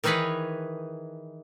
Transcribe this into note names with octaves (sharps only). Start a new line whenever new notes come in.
D#3 E3 D#4 G#4 B4 C#5